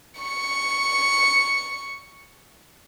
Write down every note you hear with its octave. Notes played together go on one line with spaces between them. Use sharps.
C#6 C#7